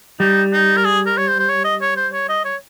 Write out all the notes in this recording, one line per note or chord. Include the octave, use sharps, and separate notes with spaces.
G3 D#4
D#4
A#4
G#4
A#4
C#5
C5
C5
C#5
D#5
C#5
C5
C#5
D#5
C#5